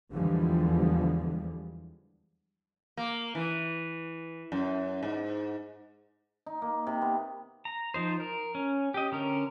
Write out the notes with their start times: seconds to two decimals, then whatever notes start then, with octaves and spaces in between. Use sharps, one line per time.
0.13 E2 D3 F3 G3 G#3
2.97 A#3
3.35 E3
4.52 F#2
5.03 G#2
6.46 D#4
6.62 A#3
6.87 C3
7.02 B3
7.65 A#5
7.94 F3 D#4 C5
8.20 A#4
8.55 C#4
8.94 G4 D#5
9.12 D3 C#4 A#4